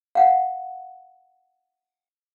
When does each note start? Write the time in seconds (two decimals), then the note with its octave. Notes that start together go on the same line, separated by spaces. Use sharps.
0.15 F5 F#5